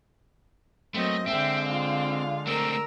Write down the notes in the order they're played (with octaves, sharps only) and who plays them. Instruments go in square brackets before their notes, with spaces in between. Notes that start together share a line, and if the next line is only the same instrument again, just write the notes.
[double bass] F#3 A#3 [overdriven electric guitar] A3 [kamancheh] C4 D#5
[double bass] D3 G#3 [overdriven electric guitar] C4 [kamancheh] E5 G5
[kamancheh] F4 F5
[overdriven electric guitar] A3 C4 [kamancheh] A#4 E6